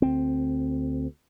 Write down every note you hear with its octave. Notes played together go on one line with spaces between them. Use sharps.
D2 C4